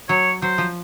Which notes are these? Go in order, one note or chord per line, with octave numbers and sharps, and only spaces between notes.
F#3 C#5
F#3 C5
F3